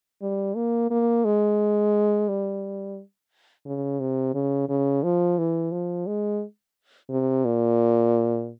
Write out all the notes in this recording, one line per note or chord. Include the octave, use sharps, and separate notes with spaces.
G3
A#3
A#3
G#3
G3
C#3
C3
C#3
C#3
F3
E3
F3
G#3
C3
A#2